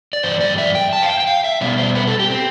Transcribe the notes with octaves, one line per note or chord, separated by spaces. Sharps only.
D5
G2 E3 C5
D5
E5
G5
A5
F5
G5
G5
F5
E5
B2 G3 B3 D5
C5
B4
A4
G4
C4